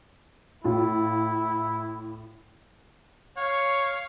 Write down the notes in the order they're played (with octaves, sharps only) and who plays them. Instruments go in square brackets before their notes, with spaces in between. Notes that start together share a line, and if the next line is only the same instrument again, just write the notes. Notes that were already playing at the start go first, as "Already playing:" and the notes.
[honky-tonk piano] A2 F4 [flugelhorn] E4
[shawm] C#5 [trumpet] F5